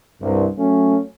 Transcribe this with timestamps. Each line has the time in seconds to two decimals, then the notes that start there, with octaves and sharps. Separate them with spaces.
0.21 C2 G2
0.57 F#3 A3 C#4